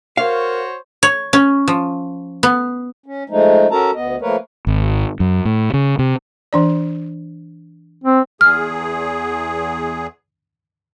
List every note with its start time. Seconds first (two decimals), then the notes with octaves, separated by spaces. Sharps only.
0.17 F#4 A#4 C5 C#5 F5
1.03 C#5
1.33 C#4
1.68 F3
2.43 B3
3.06 C#4
3.30 F3 G#3 A3 D#4
3.71 C#4 F#4 A4 A#4 A5 A#5
3.95 D2 B3 D#5
4.21 F3 A3 A#3 A#4 B4 C#5
4.67 G#1
5.20 F#2
5.45 A2
5.74 C#3
5.99 C3
6.53 E3 D4 D5
8.04 C4
8.41 E2 G#4 F6